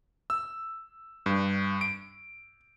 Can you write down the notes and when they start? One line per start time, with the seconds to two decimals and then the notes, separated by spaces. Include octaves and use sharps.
0.30 E6
1.26 G2
1.81 D7